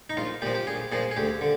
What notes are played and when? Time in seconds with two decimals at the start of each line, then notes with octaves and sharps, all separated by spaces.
0.10 D#4
0.17 A#1 F4
0.42 A#2 F3 G4
0.55 G4
0.67 A#1 G#4
0.92 A#2 F3 G#4
1.11 G#4
1.17 D2 G4
1.41 D3